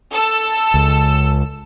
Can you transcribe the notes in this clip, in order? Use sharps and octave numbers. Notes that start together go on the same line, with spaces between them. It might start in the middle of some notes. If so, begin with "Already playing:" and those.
A4 E6
C#2